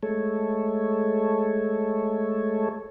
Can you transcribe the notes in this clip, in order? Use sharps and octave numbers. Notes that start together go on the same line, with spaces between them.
G#3 A3 A4 C#5